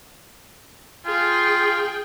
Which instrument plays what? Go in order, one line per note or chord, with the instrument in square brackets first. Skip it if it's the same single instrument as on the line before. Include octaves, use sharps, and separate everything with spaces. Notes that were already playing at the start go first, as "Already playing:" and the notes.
[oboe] F4 [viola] G#4 G5